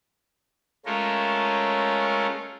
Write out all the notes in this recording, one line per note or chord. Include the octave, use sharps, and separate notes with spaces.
G#3 A3 C#4 F4 A4 A#4